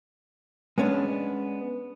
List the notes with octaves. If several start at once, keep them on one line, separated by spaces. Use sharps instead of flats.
G#3 B3 C#4 D4